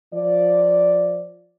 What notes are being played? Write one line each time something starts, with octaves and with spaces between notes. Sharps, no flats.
F3 D5